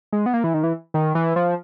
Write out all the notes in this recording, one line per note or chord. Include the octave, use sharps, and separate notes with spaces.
G#3
B3
A#3
E3
D#3
E3
D#3
E3
F3